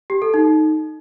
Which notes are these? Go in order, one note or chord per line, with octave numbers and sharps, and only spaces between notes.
G4
A4
D#4